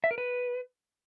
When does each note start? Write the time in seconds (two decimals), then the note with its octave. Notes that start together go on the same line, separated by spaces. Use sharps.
0.04 E5
0.11 A#4
0.18 B4